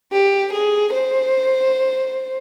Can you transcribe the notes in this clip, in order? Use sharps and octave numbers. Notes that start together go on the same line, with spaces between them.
G4
G#4
C5